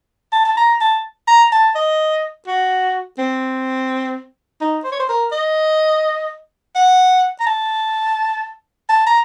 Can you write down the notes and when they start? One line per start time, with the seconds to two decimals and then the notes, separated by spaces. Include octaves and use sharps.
0.33 A5
0.45 A5
0.57 A#5
0.81 A5
1.28 A#5
1.52 A5
1.75 D#5
2.47 F#4
3.18 C4
4.61 D#4
4.84 C5
4.92 C#5
5.00 C5
5.09 A#4
5.32 D#5
6.76 F#5
7.40 A#5
7.46 A5
8.89 A5
9.07 A#5